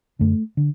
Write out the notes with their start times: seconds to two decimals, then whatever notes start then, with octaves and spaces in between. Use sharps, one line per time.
0.19 F#2 D3 A3
0.57 D3